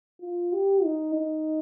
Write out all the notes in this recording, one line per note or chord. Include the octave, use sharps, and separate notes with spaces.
F4
G4
D#4
D#4